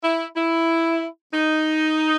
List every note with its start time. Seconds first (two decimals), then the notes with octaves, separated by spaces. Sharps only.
0.02 E4
0.35 E4
1.33 D#4